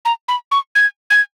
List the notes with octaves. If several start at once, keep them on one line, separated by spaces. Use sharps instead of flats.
A#5
B5
C#6
G#6
G#6